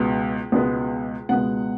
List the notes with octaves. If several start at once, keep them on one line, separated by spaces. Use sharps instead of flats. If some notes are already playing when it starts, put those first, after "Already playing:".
Already playing: C#2 B2 G#3 B3
C#2 B2 G#3 B3
C#2 B2 G#3 B3 F#5